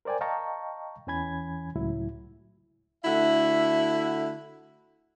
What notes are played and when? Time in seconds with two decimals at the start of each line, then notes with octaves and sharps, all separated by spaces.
0.05 A#4 C5 D5 G5 G#5
0.21 D#5 F5 G5 A5 A#5 C#6
1.07 E2 E3 C#4 G#5 B5 G#6
1.75 C#2 A2 F#3 E4
3.05 D3 A3 E4 F#4 E5